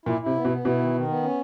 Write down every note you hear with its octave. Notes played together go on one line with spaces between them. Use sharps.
A#2 E4
C3 E4
B3
B2
B3
B2 E4
D#3
D#3
B3
C#4